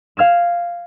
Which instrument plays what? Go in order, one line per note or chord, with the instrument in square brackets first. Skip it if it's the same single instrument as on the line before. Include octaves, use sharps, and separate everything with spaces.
[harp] F5 F6 G#6 E7